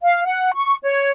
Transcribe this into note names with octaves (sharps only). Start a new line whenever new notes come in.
F5
F#5
C#6
C#5